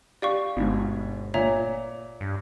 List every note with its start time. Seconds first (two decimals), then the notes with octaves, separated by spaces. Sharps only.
0.22 G4 D5 F5 C#6
0.57 G1 G#2 B2
1.34 A#2 C#5 E5 A#5
2.21 G2